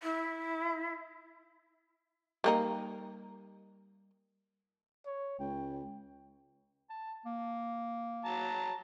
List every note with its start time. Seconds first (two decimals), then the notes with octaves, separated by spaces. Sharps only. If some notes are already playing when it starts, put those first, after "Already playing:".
0.03 E4
2.44 G3 A#3 D#4
5.06 C#5
5.40 C#2 G5
6.90 A5
7.25 A#3
8.25 F#3 A5 A#5